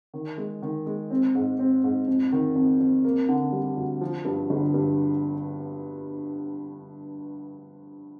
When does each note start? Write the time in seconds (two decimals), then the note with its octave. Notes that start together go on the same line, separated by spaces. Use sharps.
0.14 D#3
0.38 G#3
0.62 D#3
0.86 G#3
1.10 C4
1.35 G#2
1.59 C4
1.84 G#2
2.08 F2
2.32 D#3
2.55 F2
2.80 F2
3.04 A#3
3.28 D3
3.52 G3
3.77 D2
4.01 F3
4.25 G2
4.50 G1
4.74 G2